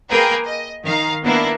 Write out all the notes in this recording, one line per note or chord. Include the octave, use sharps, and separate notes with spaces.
A#3 G#4 A#4 B4 G5 A#5
D#5
D#3 F5 A#5
A#3 B3 D4 E4